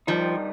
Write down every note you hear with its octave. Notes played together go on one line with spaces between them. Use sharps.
G2 D#3 F3 G3 D#4